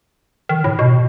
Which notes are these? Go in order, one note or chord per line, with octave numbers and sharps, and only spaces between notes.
D#3
A2
B2